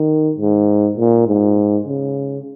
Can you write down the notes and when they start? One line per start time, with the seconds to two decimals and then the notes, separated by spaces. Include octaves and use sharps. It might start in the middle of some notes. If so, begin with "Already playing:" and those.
Already playing: D#3
0.38 G#2
0.97 A#2
1.27 G#2
1.86 C#3